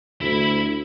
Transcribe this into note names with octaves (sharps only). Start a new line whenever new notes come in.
D2 E4 B5